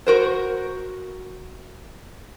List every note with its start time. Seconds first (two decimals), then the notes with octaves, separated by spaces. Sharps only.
0.07 F#4 A#4 C5